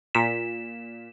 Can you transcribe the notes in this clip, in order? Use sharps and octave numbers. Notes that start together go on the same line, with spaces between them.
A#2 B6 E7